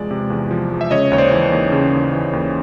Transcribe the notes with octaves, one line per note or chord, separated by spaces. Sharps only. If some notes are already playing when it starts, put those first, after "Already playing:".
Already playing: E2 C3 F3 G#3 D5
C3
E2
F3
G#3
E5
C#3 C#5 D#5
D#2 C#5
C5 D5
E3
D#2
C#3
D#2
E3
D#2